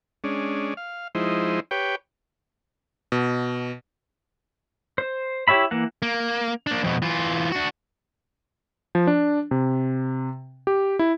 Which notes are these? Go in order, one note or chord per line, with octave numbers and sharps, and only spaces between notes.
G#3 C#4 D4
F5
F3 G#3 D#4 E4 C5
G4 B4 C#5 G5
B2
C5
E4 G4 C#5 E5 B5
E3 A#3 F#5
A#3
A#3 D4
F2 B2
E3 F4
D4 F#4
F3
D4
C3
G4
E4